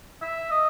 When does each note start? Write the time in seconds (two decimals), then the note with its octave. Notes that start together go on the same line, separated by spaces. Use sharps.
0.22 E5
0.51 D#5